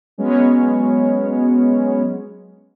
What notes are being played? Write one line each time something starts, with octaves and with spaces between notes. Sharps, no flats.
F#3 G#3 B3 C#4 C#5